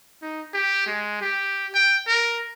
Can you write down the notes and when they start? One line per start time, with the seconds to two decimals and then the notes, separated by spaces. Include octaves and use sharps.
0.22 D#4
0.54 G4
0.87 G#3
1.22 G4
1.74 G5
2.07 A#4